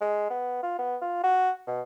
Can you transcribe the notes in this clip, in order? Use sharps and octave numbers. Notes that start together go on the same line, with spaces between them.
G#3
B3
F4
B3
F4
F#4
B2